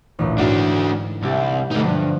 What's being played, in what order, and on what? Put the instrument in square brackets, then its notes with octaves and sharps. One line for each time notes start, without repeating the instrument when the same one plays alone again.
[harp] A1 D2 A#2
[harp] G#2 [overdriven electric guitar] D4 F#4
[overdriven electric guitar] C2 [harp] G4 E5 F#5
[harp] B2 D3 [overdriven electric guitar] A3 D#4
[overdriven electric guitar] G2 [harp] F3 F#6